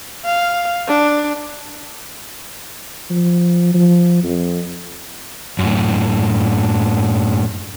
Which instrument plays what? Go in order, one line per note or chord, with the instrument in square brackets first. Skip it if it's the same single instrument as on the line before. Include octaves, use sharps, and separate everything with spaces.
[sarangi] F5
D4
[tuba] F3
F3
F2
[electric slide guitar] F#2 A2